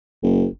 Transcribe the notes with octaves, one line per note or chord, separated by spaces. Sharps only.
F#1